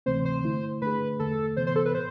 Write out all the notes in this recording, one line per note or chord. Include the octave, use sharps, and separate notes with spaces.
D2 C3 E3 A3 C4 C5
C5
D3 A3 E4
D3 A3 D4 G#4 B4
E2 D3 A3 A4
C3 E3 B3 C5
C5
A4
B4
A2 C5